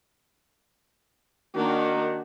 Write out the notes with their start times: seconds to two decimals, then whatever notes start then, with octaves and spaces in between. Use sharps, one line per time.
1.55 D#3 A#3 D4 F#4